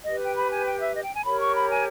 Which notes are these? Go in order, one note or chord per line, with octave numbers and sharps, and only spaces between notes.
G4 B4 D#5
G5
B5
G#5
G5
E5
D#5
G5
G#5
G4 A#4 C#5 B5
C#6
B5
G#5